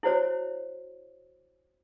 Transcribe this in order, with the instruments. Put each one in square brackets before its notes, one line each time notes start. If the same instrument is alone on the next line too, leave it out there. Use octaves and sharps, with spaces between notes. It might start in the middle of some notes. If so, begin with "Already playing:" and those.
[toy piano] E4 F#4 C5 C#5